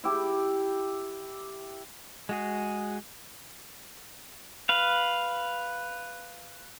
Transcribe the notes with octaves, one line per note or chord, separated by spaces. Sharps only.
E4 G4
G#3 F#4 G#4
B4 F5